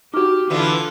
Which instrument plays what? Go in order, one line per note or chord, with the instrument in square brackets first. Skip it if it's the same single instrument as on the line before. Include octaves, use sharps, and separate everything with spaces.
[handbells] D#4 F#4 [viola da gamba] G4 [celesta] D6 F6
[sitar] D3 E3 B3 [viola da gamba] F4 A4